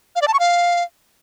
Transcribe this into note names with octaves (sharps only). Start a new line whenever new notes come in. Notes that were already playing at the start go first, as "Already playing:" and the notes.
F5
D5
A5
C#6
F5